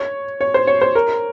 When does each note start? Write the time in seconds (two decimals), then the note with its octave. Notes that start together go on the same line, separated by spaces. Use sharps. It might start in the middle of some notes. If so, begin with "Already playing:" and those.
Already playing: C#5
0.41 C#5
0.54 C5
0.67 C#5
0.82 C5
0.95 A#4